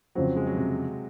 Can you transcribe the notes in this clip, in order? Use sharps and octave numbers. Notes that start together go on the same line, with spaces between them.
F2 C#3 F3 F#3 C4
G#3
F#3
C3